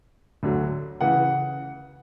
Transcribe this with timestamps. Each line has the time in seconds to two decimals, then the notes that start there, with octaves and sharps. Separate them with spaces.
0.43 D2 D3 F#3
1.00 C#3 E3 F#5